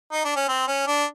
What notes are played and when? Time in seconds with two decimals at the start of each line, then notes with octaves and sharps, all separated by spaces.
0.12 D#4
0.25 D4
0.36 C#4
0.48 C4
0.68 C#4
0.87 D4